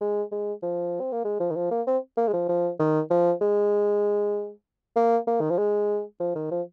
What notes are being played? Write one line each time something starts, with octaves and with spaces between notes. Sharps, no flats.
G#3
G#3
F3
C4
A#3
G#3
F3
D#3
F3
A#3
C4
A#3
G#3
F3
F3
D#3
F3
G#3
A#3
A#3
D#3
F3
G#3
F3
D#3
F3